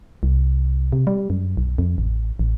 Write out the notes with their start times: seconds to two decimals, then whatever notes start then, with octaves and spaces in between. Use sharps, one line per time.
0.23 C2
0.93 C3
1.07 G3
1.30 F#2
1.57 B1
1.78 F2
1.98 A1
2.39 A1